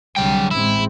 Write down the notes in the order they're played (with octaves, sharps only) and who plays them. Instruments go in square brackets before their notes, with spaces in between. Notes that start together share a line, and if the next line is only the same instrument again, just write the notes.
[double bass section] C2 D3 G3 [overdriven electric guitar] F#3 G5
[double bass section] A1 G#3 C4 [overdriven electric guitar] E4